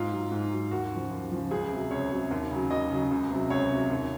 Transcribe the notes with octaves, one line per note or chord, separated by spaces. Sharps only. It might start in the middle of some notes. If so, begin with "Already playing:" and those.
Already playing: G#2 F4
F#3
G#2
F#3
D#2 F#4
C#3 F3
D#2
C#3 F3
C#2 G#4
C3 F#3
C#2 C#5
C3 F#3
D#2
C#3 F#3
D#2 D#5
C#3 F#3
C#2
C3 F#3
C#2 C#5
C3 F#3
D#2